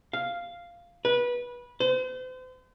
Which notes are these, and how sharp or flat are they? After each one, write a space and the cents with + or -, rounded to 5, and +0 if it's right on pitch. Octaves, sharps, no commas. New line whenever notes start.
F5 -5
B4 -20
C5 -40